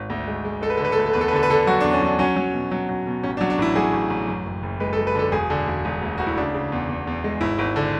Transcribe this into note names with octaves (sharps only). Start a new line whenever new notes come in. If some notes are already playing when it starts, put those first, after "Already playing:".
Already playing: G#1
D2
G#3
G#3
G#3 A4
B4
D3 A4
B4
A4
D2 B4
A4
E2 B4
A4
B4
D3 A4
B4
D3 A4
F#3 F#4
D4
E2
C#4
F#3 D4
F#3 C#4
F#3
B2
F#3
F#3
B2
A1 C#4
D4
F#3
D4
A1 E4
F#3 G#4
A1
A1
F#2
F#1
F#1
G#3 B4
A4
G#3
B4
D3 A4
E1 G#4
D3
E1
E1
D2
D2 F#4
E4
C#3 D4
C#3
E2
E2
E2
G#3
G#1 E4
G#1
D3